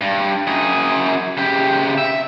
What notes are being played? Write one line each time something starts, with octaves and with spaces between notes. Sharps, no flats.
G2
F#2 G#4
C#3 G4
E5